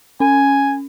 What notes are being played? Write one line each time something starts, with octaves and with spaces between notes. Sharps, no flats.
C#4 G#5